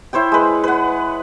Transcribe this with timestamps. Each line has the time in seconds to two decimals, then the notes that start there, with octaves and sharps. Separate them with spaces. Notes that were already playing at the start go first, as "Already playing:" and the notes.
0.13 E4 C5 C#5 G5
0.32 G#3 B4
0.63 B4 F#5